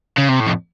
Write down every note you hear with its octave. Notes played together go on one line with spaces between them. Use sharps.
C#3
C3
A2
F2